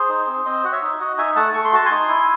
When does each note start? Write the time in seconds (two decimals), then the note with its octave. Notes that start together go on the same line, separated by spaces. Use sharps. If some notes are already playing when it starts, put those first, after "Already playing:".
Already playing: G#4 C5
0.09 D#4
0.27 C4
0.45 C4 C5 D#5
0.64 F#4 F#5
0.72 C#5 E5
0.82 D#4
1.00 F#4 D#5 F#5
1.17 D#4 E5 G#5
1.36 A3 F#5 A5
1.54 A3 C#6
1.64 C6
1.73 F#4 A5
1.86 G#5 C6
1.91 D#4
2.08 E4